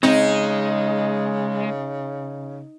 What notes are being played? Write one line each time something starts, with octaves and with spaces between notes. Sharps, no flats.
C#3 G#3 C4 D#4